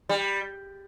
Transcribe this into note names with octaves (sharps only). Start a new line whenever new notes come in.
G3